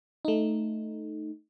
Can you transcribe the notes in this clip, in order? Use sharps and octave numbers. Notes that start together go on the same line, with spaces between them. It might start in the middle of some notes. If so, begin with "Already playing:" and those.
A3 D#4